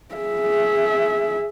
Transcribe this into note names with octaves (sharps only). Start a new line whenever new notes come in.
G#4 E5